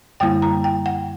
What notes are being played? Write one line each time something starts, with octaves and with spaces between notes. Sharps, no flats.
F#2 D3 G3 A#3 E4 G5
A#5
G5
F#5